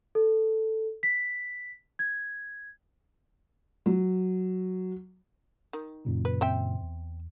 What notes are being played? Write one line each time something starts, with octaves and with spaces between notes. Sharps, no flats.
A4
B6
G#6
F#3
D#3
F#2 A#2 C#3
B4
C4 E5 G5
E2